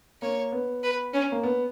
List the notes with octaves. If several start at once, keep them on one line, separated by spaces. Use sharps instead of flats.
A#3 C#5
B3
B4
C#4
A#3
B3